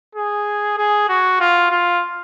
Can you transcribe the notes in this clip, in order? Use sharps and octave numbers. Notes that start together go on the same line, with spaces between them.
G#4
G#4
F#4
F4
F4